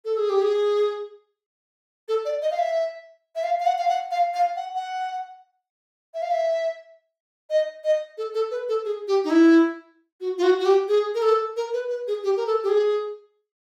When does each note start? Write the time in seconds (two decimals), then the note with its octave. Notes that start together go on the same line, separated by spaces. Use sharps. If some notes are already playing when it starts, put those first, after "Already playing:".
0.05 A4
0.17 G#4
0.30 G4
0.42 G#4
2.08 A4
2.25 D5
2.42 D#5
2.51 F5
2.59 E5
3.36 E5
3.44 F5
3.60 F5
3.66 F#5
3.78 F5
3.88 F#5
4.11 F5
4.34 F5
4.56 F#5
4.75 F#5
6.14 E5
6.22 F5
6.31 E5
7.50 D#5
7.84 D#5
8.18 A4
8.34 A4
8.51 B4
8.69 A4
8.85 G#4
9.08 G4
9.24 D#4
9.30 E4
10.21 F#4
10.38 F4
10.43 F#4
10.60 F#4
10.66 G4
10.88 G#4
11.15 A#4
11.22 A4
11.56 A#4
11.74 B4
11.90 B4
12.08 G#4
12.24 G4
12.37 A#4
12.46 A4
12.64 G4
12.69 G#4